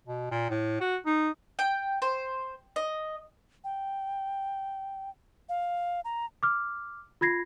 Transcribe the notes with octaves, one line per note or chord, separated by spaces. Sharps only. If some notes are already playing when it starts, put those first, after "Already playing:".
B2
A#2
A2
F#4
D#4
G5
C5
D#5
G5
F5
A#5
D6 F6
F4 B5 G#6 A#6 C7